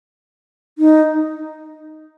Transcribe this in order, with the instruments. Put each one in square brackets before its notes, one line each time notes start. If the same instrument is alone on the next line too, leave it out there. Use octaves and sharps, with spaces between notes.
[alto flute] D#4